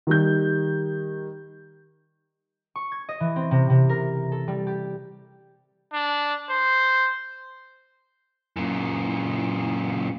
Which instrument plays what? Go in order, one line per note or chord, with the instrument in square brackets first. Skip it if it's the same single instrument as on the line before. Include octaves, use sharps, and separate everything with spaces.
[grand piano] D#3 G3 G6
[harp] C#6
G#6
D#5
E3
C4
C3
C3
A#4
A4
G3
G4
[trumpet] D4
C5
[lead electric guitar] F#2 A#2